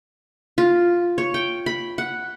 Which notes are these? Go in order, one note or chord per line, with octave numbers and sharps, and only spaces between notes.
F4
C#5
G5
B5
F#5